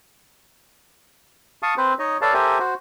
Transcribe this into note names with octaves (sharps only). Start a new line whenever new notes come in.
F5 A5 C#6 D#6
C4 B4 C5
D#4 C#5 D#5
A4 B4 C#5 D5 F5 A5
G4 A4 A#4 C5 E5 G#5
F#4 C5